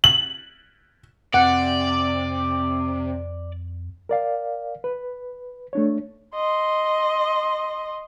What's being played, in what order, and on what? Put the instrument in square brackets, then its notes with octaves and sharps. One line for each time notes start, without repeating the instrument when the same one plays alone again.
[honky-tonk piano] F#7
[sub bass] F2 [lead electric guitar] C3 [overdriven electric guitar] D5 [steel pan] F#5
[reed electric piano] A#4 D5 F5
B4
A3 D4 C#5
[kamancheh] D#5 C6